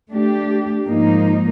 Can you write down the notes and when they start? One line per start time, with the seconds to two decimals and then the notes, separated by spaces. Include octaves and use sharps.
0.11 A3 D4 G4
0.89 G#2 F3 A#3 D#4